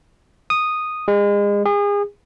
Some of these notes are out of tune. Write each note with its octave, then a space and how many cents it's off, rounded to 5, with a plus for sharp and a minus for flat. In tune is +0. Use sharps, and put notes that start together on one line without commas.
D#6 -5
G#3 -35
G#4 -35